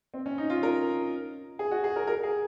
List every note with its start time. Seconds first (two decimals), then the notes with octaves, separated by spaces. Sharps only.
0.14 C4
0.26 C#4
0.38 D#4
0.50 F4
0.63 A#4
1.59 G#4
1.71 F#4
1.84 G#4
1.96 A#4
2.07 A#4
2.23 G#4